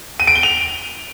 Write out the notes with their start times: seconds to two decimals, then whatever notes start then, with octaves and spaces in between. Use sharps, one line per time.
0.20 D#7
0.27 D7
0.35 G7
0.43 F7